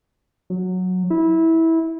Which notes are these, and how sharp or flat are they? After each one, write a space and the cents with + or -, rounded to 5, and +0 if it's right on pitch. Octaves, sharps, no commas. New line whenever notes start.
F#3 -10
E4 -20